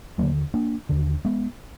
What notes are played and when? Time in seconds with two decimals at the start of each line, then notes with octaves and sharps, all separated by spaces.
0.18 D#2 D3 F#3 A#3
0.54 A#3 D4
0.89 D#2 D3
1.25 G#3 B3